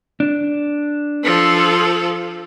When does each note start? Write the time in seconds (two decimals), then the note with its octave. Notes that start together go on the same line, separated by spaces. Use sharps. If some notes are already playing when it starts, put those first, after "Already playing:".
0.20 D4
1.23 F3 A4